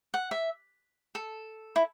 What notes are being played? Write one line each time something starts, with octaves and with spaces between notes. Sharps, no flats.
F#5
E5
A4
E4